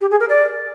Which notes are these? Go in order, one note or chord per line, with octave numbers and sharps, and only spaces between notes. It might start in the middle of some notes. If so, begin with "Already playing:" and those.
G4
G#4
A#4
D5